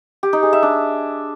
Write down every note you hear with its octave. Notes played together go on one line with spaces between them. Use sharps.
G4
D#4
G#4
E5
D4